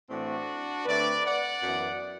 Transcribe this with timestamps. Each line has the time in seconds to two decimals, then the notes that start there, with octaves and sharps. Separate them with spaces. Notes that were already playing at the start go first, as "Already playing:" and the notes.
0.10 A2 E3 A3 C4 D4 F#4
0.86 D3 A3 C4 B4 D5
1.24 D5 F#5
1.62 F#2 E3 B3